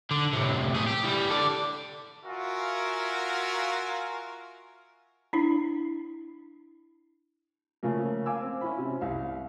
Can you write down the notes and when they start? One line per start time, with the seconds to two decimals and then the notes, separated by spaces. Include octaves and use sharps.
0.11 D3 D4
0.33 A2 C3
0.74 A3 G#4
0.87 G4
1.04 E3 G3
1.30 A4 D5
2.24 F4 F#4 A#4 E5 F5 G#5
5.33 D4 E4
7.83 C#3 F3 A3 A#3
8.26 F5 G#5 D6 E6
8.41 C4
8.61 C#4 E4 B5
8.79 C3
9.01 C2 F5